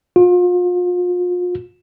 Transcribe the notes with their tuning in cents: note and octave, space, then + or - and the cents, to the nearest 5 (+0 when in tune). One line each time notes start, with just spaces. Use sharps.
F4 +35